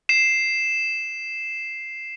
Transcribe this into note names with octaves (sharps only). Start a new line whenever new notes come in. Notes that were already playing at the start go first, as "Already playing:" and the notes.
C7 E7